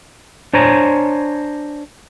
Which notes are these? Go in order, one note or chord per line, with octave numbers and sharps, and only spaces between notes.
D4 C5 C#5 G#5 A#5